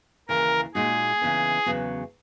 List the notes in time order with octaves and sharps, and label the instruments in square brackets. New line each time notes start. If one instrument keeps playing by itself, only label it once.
[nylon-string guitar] D#2 C#3 E3 [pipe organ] A#4
[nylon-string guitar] A#2 G#3 D#4 F#4 [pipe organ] G#4
[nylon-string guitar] C#3 E3 B3 D#4
E2 C#3 F#3 B3 F#4